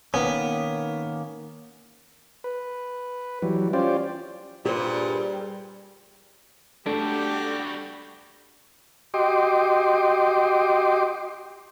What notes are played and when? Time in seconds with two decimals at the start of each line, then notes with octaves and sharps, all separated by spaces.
0.14 D#3 A#3 B3 C#4
2.44 B4
3.42 E3 F#3 G3
3.73 C#4 F4 G4 C5 D5
4.66 G2 A#2 G3 G4 G#4 C5
6.86 G3 A3 D4 F#4 G4
9.14 F#4 G4 D#5 G5 C6 D6